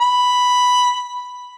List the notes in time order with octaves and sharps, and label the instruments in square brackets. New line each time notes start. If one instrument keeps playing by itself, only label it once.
[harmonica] B5